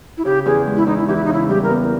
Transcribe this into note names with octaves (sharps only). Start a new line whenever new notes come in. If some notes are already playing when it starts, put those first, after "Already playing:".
E4
C#3 G4
E2 G#4
G#3
E4
E2 D#4
E4
E3 G4
E4
D#4
C#3 E4
G3 G4
A#4
B3